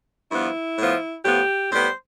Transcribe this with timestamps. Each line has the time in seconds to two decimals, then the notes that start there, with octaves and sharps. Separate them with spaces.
0.32 G2 F3 B3 E4
0.78 A2 F3 B3
1.25 A2 F3 B3 G4
1.72 A2 G3 B3 C5